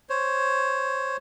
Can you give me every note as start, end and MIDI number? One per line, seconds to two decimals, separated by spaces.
0.10 1.17 72
0.10 1.17 73